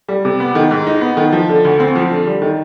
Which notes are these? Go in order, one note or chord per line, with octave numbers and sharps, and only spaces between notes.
G3
C3
B3
D#3
G#2
D#4
B3
D#3
F3
D3
D2
C4
F3
D3
G3
D#3